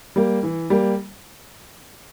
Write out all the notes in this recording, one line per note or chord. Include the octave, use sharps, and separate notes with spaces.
G3 A#3
E3
G3 A#3